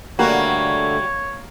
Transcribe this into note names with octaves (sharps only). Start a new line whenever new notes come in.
D3 G3 A3 A#3 F#4 C#5